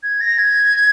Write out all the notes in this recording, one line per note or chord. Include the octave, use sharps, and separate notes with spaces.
G#6
A#6
G#6